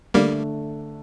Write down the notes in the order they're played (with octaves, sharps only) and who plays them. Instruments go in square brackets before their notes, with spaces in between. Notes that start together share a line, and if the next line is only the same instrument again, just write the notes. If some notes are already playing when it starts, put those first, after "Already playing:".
[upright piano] D3 A3 D4 [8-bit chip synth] G3 A#3